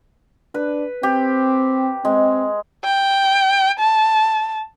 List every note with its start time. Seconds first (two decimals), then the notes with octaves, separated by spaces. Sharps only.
0.54 D4 B4
1.03 C4 G4
2.05 G#3 C4
2.84 G5
3.79 A5